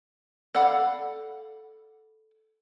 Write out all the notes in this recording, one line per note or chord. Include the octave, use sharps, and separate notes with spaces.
A4 D5 F5 F#5 B5